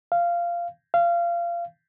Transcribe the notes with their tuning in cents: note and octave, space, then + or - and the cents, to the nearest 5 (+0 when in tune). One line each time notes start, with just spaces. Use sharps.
F5 -15
F5 -25